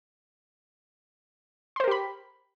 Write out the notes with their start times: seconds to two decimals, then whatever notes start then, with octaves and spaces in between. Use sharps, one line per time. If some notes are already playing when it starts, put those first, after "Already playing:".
1.76 C6
1.80 C5
1.84 A#4
1.88 G4
1.91 B5